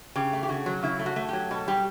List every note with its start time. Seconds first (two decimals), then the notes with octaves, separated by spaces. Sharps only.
0.16 C#3 G4
0.33 A3
0.43 G4
0.49 C#3 F#4
0.66 F#3
0.82 C#3 E4
0.99 A3
1.06 F#4
1.16 A3
1.29 F#3 G4
1.51 B2 A4
1.68 G3 G4